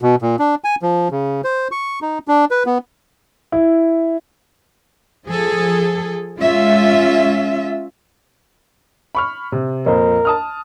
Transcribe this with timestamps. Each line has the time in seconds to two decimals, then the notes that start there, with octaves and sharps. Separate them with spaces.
0.02 B2
0.22 A#2
0.39 D4
0.64 G#5
0.82 F3
1.11 C#3
1.44 C5
1.71 C#6
2.02 D#4
2.28 D4
2.51 B4
2.66 B3
3.52 E4
5.27 F3 G#4 A4
6.38 G#3 C#4 F4 E5
9.15 B5 C#6 F6
9.52 C3
9.86 F2 A#2 A#4 C5
10.25 A5 D#6 F6